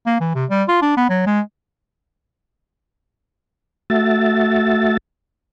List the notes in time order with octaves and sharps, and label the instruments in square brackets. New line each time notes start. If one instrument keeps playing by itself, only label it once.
[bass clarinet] A#3
E3
C3
G3
F4
D4
B3
F#3
G#3
[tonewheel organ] A3 F#4 E5 A6